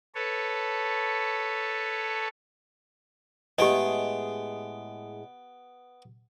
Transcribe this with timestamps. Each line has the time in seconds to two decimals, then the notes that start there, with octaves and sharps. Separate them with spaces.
0.15 A4 B4 C#5
3.58 A2 G#3 B3 G4 G#4 D#5 G5